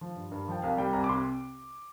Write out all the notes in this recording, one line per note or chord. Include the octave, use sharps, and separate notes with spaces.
F3
G2
G2 A#4
F3 G5
C2 F5
G3 G5
C2 A#5
D6
C3 C6